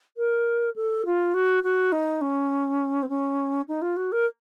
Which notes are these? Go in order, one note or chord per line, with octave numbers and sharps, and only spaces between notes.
A#4
A4
F4
F#4
F#4
D#4
C#4
C4
C#4
D#4
F4
F#4
A#4